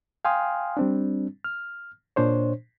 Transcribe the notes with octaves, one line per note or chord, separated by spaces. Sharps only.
F5 G5 G#5 C6 D#6 F6
G3 C4 D4
F6
A#2 D4 C5 C#5